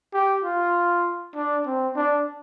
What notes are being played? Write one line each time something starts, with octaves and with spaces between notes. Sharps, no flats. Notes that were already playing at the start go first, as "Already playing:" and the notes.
G4
F4
D4
C4
D4